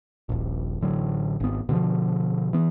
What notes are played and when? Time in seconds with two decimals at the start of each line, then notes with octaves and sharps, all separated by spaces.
0.29 D#1 A#1
0.81 A1 D3 F#3
1.40 G#1 B3
1.69 B2 D3 E3 F3
2.53 E3 B3